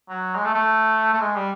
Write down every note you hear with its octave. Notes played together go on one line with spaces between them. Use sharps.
F#3
G#3
A3
A3
A3
G#3
G3